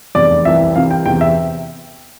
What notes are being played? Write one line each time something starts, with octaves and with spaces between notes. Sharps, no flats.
F1 E2 C3 D5
C2 C3 E3 E5
C2 C3 E3 F5
G5
E2 C3 E3 G5
E5